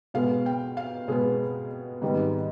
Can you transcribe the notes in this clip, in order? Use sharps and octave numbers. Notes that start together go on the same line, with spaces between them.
B2 G#3 B3 F5
G5
F5
B2 G#3 B3 G#4
G#2 D#3 G3 B3